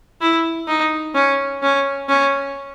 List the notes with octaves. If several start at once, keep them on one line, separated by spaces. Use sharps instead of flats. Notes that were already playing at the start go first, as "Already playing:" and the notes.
E4
D#4
C#4
C#4
C#4